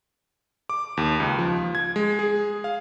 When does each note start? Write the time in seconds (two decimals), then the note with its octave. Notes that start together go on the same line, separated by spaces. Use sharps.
0.69 D6
0.97 D#2
1.20 C#2
1.39 F3
1.75 G#6
1.96 G#3
2.19 G#4
2.64 F5